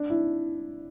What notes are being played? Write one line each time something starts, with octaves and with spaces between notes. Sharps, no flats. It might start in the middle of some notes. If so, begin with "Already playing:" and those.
Already playing: D4
E4